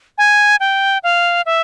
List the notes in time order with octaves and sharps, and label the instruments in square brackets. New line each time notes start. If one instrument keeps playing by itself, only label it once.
[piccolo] G#5
G5
F5
E5